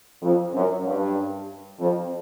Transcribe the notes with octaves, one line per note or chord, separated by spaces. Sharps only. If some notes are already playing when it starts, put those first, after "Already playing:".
F2
F#2
G2
F2